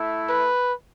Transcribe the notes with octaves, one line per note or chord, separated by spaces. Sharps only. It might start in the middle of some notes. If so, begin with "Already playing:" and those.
Already playing: A3 E4
B4